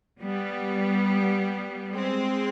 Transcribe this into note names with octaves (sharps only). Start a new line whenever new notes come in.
G3 B3
G#3 C4